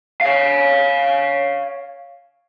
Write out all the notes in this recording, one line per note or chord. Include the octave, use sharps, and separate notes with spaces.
C#5 F5